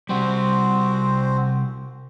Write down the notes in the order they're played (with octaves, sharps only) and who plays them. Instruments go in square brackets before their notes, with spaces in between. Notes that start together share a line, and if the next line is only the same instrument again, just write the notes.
[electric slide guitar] C3 G3 [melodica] C4 F#4 C5